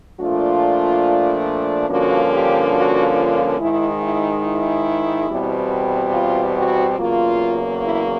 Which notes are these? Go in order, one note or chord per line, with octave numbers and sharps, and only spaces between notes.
A#2 F3 A3 D4 F4
G2 D3 F3 A#3 C#4 F#4
G4
F#4
F4
G#2 D#3 G#3 E4
E4
E4
E2 B2 G3 C4
F4
F#4
E2 C#3 F#3 A#3 F4
E4